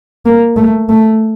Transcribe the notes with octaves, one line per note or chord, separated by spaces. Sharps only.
A#3
A3
A3